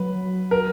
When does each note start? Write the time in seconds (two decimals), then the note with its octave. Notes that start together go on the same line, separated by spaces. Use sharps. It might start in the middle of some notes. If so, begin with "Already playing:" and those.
Already playing: F#3 B4
0.51 A#4